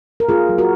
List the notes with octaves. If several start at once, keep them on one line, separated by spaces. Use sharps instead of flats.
A#4
A#3 F4 G#4
F#3
F#4 A#4